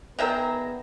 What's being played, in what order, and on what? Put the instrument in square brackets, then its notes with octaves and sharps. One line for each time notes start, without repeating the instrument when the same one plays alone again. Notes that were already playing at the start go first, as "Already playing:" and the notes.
[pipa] D#3 E5 G5 [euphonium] B3 [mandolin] G#4 A#5 [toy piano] A#4 D5